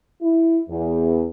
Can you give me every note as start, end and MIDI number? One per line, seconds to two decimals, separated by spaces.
0.22 0.59 64
0.69 1.27 40